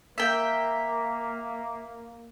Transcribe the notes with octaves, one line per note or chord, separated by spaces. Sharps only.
A#3 E5 G5